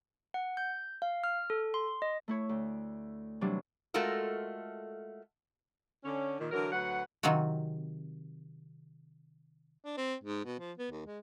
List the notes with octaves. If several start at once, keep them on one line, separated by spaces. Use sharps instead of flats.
F#5
G6
F5
F6
A4
C6
D#5
A3 E4 C#5
D2
C3 E3 F#3 G3 D4
G#3 A3 F4 F#4 A4 A#4
D3 C#4
A#2 D#3
D3 E3 F#3 A#4
D2 F#3 B4 F#5
C3 D#3 F#3 C4 F4 F#4
D4
C4
G#2
B2
F3
B3
D#2
G#3